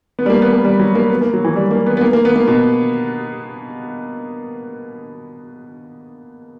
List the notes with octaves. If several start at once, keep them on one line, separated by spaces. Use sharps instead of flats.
B3
G3
A#3
B3
A#3
G3
F#3
A#3
B3
A#3
F#3
E3
G3
A#3
B3
B3
A#3
A#3
B3
A#3
B2